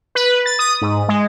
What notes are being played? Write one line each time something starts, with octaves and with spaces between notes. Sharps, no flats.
B4
A6
D#6
G#2
G#3